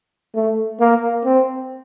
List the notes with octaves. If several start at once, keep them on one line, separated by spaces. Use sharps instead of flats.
A3
A#3
C4